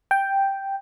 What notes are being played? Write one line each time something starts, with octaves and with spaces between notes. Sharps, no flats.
G5